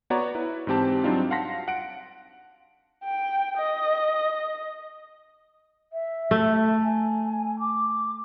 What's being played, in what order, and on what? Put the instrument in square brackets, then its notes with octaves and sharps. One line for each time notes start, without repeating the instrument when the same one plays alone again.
[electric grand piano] B3 F#4 C#5 D5 A#5
E4 B4
G#2 E3 C4 G4 A5
F#3 G3 C4 D4 D#4 F4
F5 F#5 A5 C6 A#6 B6
F#5 D7
[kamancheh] G5
D#5
[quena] E5
[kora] A3
[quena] G#5
D6